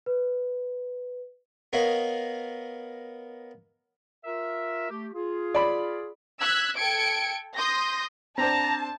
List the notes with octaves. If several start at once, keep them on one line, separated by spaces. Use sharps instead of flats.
B4
B3 A#4 C#5 D#5 F5 B5
F4 A#4 E5
A3 G4
F4 G#4
D5 B5
E6 F#6 G#6 B6
A4 G5 G#6 C#7 D7
C6 D#6 G6 A#6
C4 D4 C5 A5 A#5